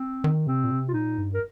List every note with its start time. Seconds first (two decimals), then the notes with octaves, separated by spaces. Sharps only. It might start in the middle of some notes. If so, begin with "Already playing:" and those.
Already playing: C4
0.24 D#3
0.47 C3 C4
0.64 A#2
0.71 C3
0.88 F4
0.94 A#2 D#4
1.18 G2
1.34 A#4